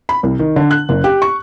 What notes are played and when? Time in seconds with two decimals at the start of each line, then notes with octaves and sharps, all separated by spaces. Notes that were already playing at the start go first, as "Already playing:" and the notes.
0.09 B5
0.23 C2
0.39 D#3
0.56 D3
0.71 F#6
0.89 F#1
1.04 G4
1.22 C#6